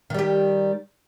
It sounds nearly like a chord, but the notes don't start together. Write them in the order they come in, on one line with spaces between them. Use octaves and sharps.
D#3 G3 G4